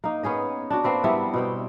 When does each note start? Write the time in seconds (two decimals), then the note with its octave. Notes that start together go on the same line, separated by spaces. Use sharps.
0.04 A#3 D#4
0.23 B3 C#4 G#4 D#5
0.70 D4 F#4
0.84 A#3 C4 B4
1.04 G3 B3 E4
1.34 B2 C4 G5